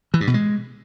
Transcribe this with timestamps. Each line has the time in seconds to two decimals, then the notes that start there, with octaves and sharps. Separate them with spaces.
0.14 E3
0.20 G2
0.27 B2
0.34 G#3